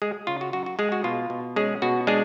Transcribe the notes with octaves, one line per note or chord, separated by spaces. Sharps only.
G#3 G#4
C#3 F4
F#4
F#2 F#4
F#4
G#3 G#4
F#4
B2 F4
B2
G#3 C#4 G#4
B2 F#4
G#3 D4 G#4